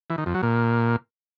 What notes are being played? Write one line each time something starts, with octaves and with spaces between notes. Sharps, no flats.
E3
D#3
F2
F#3
A#2